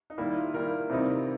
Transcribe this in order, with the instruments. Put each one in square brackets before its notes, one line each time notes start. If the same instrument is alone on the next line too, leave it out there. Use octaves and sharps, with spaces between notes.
[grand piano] D#4
[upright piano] D#3 G3 A#3 [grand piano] E4
[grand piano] F4
[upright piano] D#3 G3 A#3 [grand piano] A#4
[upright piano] C3 E3 G3 C4 D#4